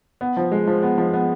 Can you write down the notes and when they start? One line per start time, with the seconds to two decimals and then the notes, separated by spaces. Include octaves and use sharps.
0.21 B3
0.37 F3
0.52 G#3
0.67 F3
0.82 B3
0.98 F3
1.13 B3